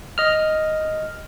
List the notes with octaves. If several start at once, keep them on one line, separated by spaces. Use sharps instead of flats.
D#5 F6